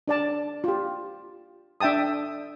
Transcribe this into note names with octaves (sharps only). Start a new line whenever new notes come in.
D4 D5 A5
F4 G4
D4 E5 G5 A5 D#6